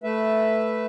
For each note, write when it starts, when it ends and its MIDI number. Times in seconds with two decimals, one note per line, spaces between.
0.04 0.86 57
0.04 0.86 71
0.04 0.86 76